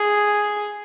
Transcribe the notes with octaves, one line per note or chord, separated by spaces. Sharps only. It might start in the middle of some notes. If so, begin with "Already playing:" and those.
Already playing: G#4